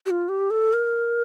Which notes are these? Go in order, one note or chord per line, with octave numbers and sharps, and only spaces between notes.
G4
F4
G4
A4
A#4